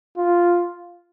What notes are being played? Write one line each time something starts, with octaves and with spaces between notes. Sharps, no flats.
F4